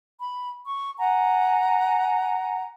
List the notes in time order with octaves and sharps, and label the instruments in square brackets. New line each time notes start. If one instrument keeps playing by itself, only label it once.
[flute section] B5
C#6
F#5 G#5 A#5